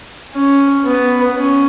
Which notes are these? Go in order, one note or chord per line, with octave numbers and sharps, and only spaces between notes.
C#4
B3
C#4